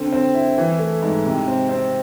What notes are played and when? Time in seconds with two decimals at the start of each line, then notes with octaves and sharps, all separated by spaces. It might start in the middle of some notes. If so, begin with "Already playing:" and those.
Already playing: D3 C4
0.12 C4
0.35 E4
0.58 E3
0.79 A3
1.02 G#2
1.25 C3
1.48 C4
1.69 C4